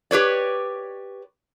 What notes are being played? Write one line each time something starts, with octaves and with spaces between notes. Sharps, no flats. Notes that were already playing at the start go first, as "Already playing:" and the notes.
G4 B4 C#5 D5